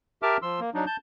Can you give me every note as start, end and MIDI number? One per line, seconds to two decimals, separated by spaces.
0.23 0.37 67
0.23 0.37 70
0.23 0.37 76
0.23 0.37 81
0.23 0.37 86
0.23 0.37 89
0.42 0.60 53
0.42 0.60 84
0.42 0.60 88
0.60 0.70 58
0.74 0.85 54
0.74 0.85 62
0.74 0.85 63
0.87 0.97 81
0.87 0.97 91